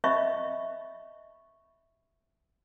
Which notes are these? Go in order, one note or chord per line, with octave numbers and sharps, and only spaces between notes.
D#5 E5 B5 C#6